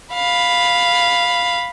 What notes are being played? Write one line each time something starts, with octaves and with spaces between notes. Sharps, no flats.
F5 B5